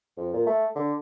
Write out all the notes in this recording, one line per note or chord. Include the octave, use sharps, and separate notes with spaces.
F2
A#2
A3
D3